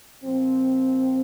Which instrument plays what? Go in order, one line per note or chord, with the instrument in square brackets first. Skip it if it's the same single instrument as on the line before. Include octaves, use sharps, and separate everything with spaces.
[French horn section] A#2 F3 C4